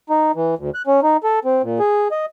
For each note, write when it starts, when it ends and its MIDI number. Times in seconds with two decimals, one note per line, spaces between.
0.10 0.32 63
0.35 0.55 52
0.59 0.70 38
0.75 0.82 90
0.87 1.00 61
1.03 1.17 63
1.24 1.39 69
1.45 1.62 60
1.63 1.79 46
1.79 2.08 68
2.11 2.26 75